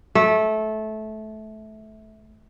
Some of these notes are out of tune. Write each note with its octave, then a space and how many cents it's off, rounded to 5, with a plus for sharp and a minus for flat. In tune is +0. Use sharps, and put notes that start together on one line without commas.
A3 -20